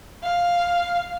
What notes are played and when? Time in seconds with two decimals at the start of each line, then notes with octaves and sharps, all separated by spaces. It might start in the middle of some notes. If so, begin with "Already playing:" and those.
0.23 F5